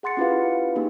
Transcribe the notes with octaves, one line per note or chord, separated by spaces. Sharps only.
G#4 F#5 C6 A6 C#7
C#4 E4 F4 G4 B4 F5
A#3 C#4 D#4 G4 G#4